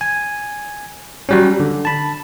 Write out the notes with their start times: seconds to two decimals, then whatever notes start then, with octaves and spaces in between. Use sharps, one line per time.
0.01 G#5
1.29 F#3 G3 C#4
1.60 D3
1.85 A5 B5